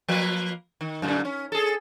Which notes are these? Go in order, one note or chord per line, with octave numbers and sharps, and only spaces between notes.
F3 A#3 B4
D#3
F#2 A#2 D3
C#4
G#4 A4